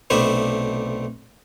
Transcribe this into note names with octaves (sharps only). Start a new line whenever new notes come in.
B1 C3 A3 D4 B4 C5